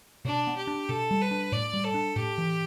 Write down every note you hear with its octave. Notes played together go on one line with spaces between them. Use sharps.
B2 D4
B3
G4
D4
B2 A4
G3
B4
D4
A2 D5
G3
A4
D4
A2 G4
E3